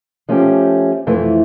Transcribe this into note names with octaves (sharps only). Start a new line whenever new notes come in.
F3 A3 C#4 G4
F2 E3 A3